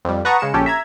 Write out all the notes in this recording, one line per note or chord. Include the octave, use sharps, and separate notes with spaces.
F2 G3
B4 F#5 A5 A#5 C#6 D#6
C#3 G#3 C#7 E7
A#1 C#4 G4 A4
E5 A#5 G#6